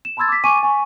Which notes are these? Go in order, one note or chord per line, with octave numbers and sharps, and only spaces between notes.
E7
A5 B5 C6 E6 G#6 A6
D6 B6
G#5 C#6 D6 D#7
G#5 C#6